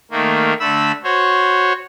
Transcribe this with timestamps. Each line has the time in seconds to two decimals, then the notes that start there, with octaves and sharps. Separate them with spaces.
0.11 D#3 A3 A#3
0.60 D3 A3 B5 E6
1.04 F#4 C5 C#5